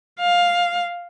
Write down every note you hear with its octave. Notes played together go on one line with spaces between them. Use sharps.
F5